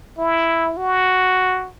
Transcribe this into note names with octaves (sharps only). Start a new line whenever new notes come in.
E4
F#4